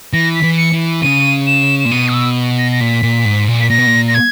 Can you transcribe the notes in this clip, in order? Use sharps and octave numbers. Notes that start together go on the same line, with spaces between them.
E3 A#6
B6
E3
C#7
E3
C#3 D#7
E7
E7
A#2
B2 D#7
D#6
E6
A#6
A#6
A#2 B6
A#2
G#2
A#2
B6
A#2 A#6
B2
A#2
A#6
G#6